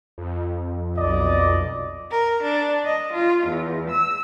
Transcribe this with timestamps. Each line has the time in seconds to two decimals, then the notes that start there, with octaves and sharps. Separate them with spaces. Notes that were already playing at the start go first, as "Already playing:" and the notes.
0.18 F2
0.98 B1 D5 D#5
2.11 A#4
2.44 D4
2.84 D#5
3.13 F4
3.46 E2
3.91 E6